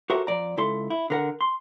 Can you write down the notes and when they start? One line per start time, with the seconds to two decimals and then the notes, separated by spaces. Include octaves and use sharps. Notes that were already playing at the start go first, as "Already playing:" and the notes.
0.10 F#4 G4 A4 A#4 C5 E5
0.27 F2 D5 A#5
0.57 C#2 E4 A4 C6
0.90 E4
1.10 D3 A#4 F#5
1.41 C6